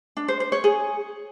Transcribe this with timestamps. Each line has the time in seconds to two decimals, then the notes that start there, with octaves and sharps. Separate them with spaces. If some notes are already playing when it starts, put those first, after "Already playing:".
0.17 D4
0.28 C5
0.40 C5
0.52 C#5
0.64 G#4